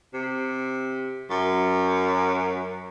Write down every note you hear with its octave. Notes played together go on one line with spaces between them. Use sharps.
C3
F#2